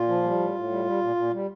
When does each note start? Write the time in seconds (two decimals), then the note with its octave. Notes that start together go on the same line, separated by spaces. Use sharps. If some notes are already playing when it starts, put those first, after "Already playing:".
Already playing: A#2 F4
0.08 F3
0.23 G3
0.39 A2
0.55 A2
0.70 G3
0.85 G3
1.01 A#2
1.16 A#2
1.32 G3